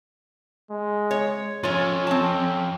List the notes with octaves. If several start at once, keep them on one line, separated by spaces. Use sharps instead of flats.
G#3
C#5
F2 C#4 F4 C#5
C4 A5